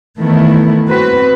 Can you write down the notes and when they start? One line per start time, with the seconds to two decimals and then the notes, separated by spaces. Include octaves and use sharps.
0.20 D#3 E3 A3 B3 E4
0.87 C4 F#4 B4